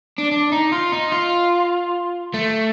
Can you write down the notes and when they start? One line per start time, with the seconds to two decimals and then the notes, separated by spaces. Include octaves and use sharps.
0.18 D4
0.31 D4
0.52 D#4
0.72 F4
0.92 D#4
1.12 F4
2.34 A3